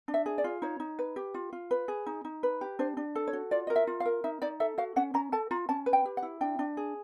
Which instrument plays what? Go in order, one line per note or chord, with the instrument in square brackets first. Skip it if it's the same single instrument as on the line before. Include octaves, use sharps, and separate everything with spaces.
[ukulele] D4
E5
G#4
D5
F4
D#4 C#5
D#4
B4
G4
F4
F4
B4
G#4
D#4
D#4
B4
G4
D4 C5
D4
A4
C#5
F#4
F4 D5
D#5
A#4
E5
F4
F5
A#4
D#4 E5
D#4 D5
A4 E5
F#4 F5
C#4 F#5
C#4 A#5
A4 A5
F4 A#5
C#4 A5
B4
G5
G4
F#5
E4
D4 G5
D4
G#4